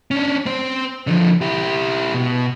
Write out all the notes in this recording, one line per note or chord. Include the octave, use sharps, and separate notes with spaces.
C#4 D4
C4 C5
D3 F3
E4 G4
B2